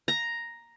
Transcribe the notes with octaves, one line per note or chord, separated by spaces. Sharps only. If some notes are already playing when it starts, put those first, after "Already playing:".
A#5